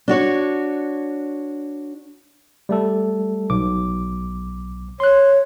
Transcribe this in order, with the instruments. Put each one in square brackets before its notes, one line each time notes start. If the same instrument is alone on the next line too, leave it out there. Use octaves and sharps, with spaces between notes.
[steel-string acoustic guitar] D4 F#4 C#5
[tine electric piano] G3 A3 A4
B1 D6
[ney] C#5 [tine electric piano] C6 F#6